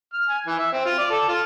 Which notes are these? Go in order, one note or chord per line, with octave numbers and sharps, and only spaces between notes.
F6
G#5
E3
E5
C4
F4
D5
A4
F4